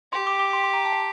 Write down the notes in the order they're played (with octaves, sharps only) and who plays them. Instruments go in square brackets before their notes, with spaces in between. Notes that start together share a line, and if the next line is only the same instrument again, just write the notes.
[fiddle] G4 [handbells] C6
[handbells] D6
D6
C6
C6
A#5
A5
G5